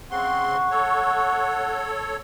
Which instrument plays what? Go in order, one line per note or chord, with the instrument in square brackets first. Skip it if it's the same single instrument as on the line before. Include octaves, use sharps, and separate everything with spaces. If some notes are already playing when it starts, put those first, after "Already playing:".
[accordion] C#3 C4 C6 [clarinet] F#5 [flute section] C#6
[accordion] A4 C#5